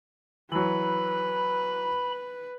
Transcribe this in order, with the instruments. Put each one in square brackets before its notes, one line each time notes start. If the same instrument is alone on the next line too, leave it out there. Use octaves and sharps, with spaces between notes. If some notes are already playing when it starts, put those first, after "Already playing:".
[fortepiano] E3 F#3 [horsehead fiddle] B4 [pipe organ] B5